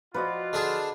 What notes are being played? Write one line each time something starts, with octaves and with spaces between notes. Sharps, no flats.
F3 F4 F#4 B4 D5 D#5
D3 D4 G#4